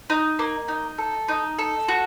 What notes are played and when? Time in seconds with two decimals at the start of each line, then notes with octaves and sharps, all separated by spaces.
0.10 D#4
0.39 A#3
0.68 D#4
0.98 A4
1.29 D#4
1.59 A4
1.88 F#4